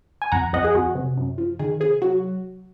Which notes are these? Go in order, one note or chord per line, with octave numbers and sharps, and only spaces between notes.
G#5
F2 F#5 A#5
F2 D#5 F#5
G#4
F2 F#4
C3
F#2
F3
D#3 G#4
C3 G#4
F#3 F#4